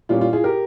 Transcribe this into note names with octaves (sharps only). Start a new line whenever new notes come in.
A#2 G3 C#4 F4
F4
F4 G#4
G4 A#4